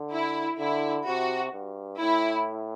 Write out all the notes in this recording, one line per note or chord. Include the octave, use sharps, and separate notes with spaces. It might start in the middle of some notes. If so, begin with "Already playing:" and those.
Already playing: D3
E4
D3 E4
C3 F#4
G2
A2 E4